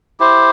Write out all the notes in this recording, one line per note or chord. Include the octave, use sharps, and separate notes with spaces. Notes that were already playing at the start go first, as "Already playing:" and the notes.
E4 G4 C5